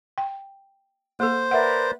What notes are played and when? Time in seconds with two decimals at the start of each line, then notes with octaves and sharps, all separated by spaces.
0.18 G5
1.20 A#3 A4 C5
1.51 A#4 B4 D5 E5 F#5